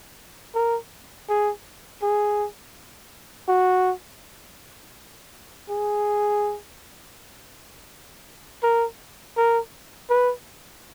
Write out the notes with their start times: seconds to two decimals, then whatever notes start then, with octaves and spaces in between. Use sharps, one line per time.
0.55 A#4
1.29 G#4
2.02 G#4
3.48 F#4
5.69 G#4
8.63 A#4
9.37 A#4
10.10 B4